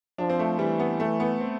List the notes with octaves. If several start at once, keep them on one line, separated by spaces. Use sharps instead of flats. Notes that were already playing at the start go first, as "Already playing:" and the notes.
F3 D4
C4
A3
E3 G3
B3
A3
B3
C4